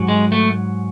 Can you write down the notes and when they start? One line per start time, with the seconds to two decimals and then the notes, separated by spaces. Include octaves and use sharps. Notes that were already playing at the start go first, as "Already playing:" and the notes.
Already playing: G#2 F#3
0.08 G#3
0.32 A3